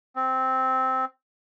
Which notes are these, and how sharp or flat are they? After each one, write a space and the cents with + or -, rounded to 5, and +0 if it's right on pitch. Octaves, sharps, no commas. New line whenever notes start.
C4 -5